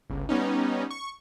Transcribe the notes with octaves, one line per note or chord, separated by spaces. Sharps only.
G1 C#2
G3 B3 C#4 D#4
C#6